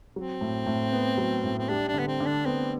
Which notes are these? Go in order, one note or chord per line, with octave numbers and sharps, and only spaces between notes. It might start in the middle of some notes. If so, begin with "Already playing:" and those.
F#3 C4
A2
A2
B3
F#3
A2
C4
G3 D4
D4
D3 B3
C4
D3
D4
B3 C4